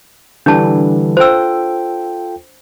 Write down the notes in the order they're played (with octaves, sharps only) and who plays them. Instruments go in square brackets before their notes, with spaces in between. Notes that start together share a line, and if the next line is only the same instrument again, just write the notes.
[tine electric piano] D3 E3 G3 [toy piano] D4 A5
[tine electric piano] F4 A4 G5 [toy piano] C5 E6